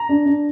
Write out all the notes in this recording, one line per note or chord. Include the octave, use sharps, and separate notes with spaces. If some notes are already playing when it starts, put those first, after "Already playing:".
Already playing: A#5
D4
D4